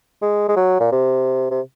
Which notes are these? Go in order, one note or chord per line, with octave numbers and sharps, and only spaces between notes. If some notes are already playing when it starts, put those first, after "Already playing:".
G#3
G#3
F#3
A#2
C3
C3